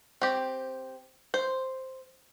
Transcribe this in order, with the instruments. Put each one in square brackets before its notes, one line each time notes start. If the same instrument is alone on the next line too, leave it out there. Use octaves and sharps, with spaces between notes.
[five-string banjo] C4 G4
C5